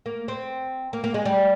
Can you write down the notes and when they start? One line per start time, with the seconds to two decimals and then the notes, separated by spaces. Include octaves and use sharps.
0.06 A#3
0.28 C4
0.93 A#3
1.04 A#3
1.14 G#3
1.25 G3